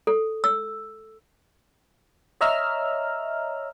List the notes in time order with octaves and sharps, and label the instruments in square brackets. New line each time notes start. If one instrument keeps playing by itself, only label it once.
[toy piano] A4
E6
[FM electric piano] C#5 D#5 E5 A#5 E6 F6